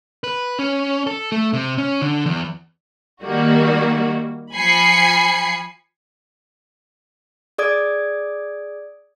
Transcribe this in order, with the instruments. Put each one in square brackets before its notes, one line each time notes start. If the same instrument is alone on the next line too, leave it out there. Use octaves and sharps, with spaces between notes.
[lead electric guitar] B4
C#4
A4
A3
C3
C#4
D3
E2
[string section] D#3 G3 A#3 F#4
F3 G#5 B5 C7 C#7
[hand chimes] G#4 D5 D#6 G#6 D7